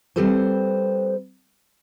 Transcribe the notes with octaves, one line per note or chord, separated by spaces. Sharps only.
G3 C4 A4 B4 C5